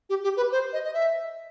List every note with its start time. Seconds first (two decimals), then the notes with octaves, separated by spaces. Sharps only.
0.10 G4
0.24 G4
0.37 B4
0.52 C5
0.73 D#5
0.84 D#5
0.94 E5